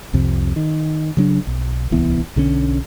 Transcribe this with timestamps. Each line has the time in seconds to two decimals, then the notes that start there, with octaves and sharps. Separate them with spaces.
0.13 C2 F2 C3
0.56 D#3
1.17 C#3 F#3 D4
1.47 B1
1.91 D1 C2 E3 B3
2.36 B1 D3 F3 C#4